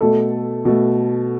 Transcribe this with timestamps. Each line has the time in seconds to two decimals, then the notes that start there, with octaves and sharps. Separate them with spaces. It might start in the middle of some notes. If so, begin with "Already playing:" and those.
0.01 B2 A3 A4
0.65 B2 A3